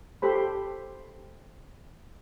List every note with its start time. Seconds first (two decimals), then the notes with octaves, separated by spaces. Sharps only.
0.22 G4 A4 C5 B5